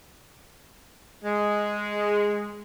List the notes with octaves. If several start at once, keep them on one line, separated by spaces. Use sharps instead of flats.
G#3